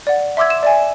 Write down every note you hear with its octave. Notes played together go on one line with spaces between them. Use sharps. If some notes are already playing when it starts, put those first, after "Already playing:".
D5 F#5
E5 C6 D6 E6 G#6
E7
D5 E5 G#5